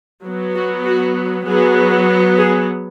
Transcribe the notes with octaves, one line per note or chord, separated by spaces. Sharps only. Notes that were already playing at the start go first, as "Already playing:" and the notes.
F#3 B3
F#4
F#4
F#3 B3 G#4
G#4